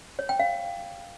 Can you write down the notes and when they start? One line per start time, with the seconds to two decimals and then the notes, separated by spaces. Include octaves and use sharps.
0.19 C#5
0.29 G5
0.40 F5